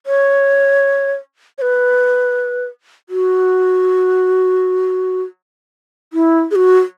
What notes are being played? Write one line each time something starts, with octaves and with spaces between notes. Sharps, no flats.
C#5
C#5
B4
F#4
E4
G#4
F#4